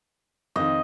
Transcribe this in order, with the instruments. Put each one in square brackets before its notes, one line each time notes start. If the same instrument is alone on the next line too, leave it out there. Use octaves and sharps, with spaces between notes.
[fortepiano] F2 D#3 [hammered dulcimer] D#5